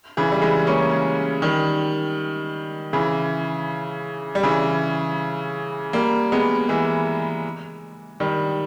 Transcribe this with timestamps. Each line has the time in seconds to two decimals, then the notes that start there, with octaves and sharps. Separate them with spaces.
0.17 C#3 E3
0.32 G3
0.42 E3 G#3
0.67 A#3 C#4
1.42 D#3 G3
2.93 C#3 E3
4.35 G3
4.43 C#3 E3
5.93 G3 A#3
6.32 G#3 B3
6.69 E3 G#3
8.20 D#3 G3